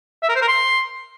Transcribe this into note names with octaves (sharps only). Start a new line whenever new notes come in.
E5
A#4
C5
A#4
C6